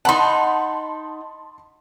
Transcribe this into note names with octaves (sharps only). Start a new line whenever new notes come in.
D#4 F#5 A5 B5 C6